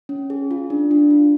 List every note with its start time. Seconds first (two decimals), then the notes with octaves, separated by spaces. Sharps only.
0.09 C#4
0.30 G#4
0.51 F4
0.70 D4
0.91 D4
1.11 F4